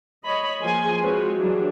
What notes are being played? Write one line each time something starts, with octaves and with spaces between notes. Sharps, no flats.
C#5 D#5 B5
F3 A#3 G#4 G#5 C6
G#3 C4 F4 F#4 B4 C#5
E3 F#3 G3 D4 F#4 G#4